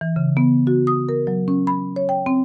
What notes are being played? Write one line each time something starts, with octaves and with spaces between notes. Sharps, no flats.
E3
C#3
B3
F#4
D#6
A#4
F#3
C#4
B5
C#5
G5
C4